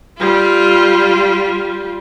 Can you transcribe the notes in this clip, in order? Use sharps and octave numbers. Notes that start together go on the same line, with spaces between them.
G3 F4